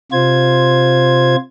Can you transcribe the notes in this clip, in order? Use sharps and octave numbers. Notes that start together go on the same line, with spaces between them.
C3 F4 C5 G#6